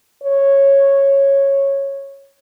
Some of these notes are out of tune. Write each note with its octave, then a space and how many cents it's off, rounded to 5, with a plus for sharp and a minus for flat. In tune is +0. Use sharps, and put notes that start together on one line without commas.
C#5 -10